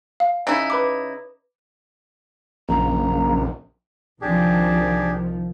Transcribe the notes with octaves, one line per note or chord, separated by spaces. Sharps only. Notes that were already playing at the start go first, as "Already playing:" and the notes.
F5
C#3 D#4 E4
B4 B5 D6
A#1 F#2 C#3 A#3 A#5
C2 D#3 F3 D4 G4 G#4